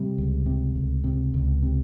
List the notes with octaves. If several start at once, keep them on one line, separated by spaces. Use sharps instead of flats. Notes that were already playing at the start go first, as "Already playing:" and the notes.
Already playing: C3 G3
C#2
C3
C#2
C3
C#2
C3